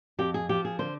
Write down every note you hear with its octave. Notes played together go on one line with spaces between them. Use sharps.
F2 G4
G#4
F3 G4
G#4
D3 C5